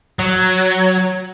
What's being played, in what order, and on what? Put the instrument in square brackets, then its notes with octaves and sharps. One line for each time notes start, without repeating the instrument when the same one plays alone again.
[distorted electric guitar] F#3